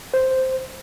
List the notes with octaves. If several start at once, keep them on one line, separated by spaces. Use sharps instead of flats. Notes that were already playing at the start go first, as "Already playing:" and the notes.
C5